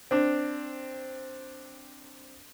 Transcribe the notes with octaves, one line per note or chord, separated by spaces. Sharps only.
C4 D4